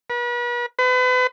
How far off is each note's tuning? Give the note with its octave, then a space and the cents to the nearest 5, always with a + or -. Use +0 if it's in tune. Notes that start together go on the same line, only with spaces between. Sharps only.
B4 -40
B4 +35